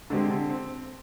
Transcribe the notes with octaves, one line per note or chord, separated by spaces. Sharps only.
D3 G#3 C4 G4
D3
C4